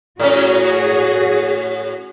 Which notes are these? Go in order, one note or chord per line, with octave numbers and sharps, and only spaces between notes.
A2 C#4 F#4 G#4